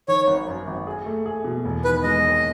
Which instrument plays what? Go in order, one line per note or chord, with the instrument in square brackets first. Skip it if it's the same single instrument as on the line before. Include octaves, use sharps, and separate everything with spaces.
[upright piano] D#3 [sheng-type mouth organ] C#5
[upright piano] G#1
F#2
G#1
G#4
A3
G#4
B2
E1
[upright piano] D#3 [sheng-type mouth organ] B4
[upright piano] G#3 [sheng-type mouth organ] D#5
[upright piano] D#2